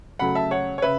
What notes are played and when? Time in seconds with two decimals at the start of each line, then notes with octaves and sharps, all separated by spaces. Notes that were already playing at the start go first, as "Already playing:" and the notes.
0.19 C#3 F#3 A3 F#5 B5
0.35 E5 A5
0.51 C#5 F#5
0.78 C#5
0.82 C#3 B4 E5